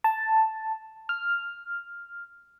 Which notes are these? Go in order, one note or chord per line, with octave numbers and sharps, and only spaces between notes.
A5
F6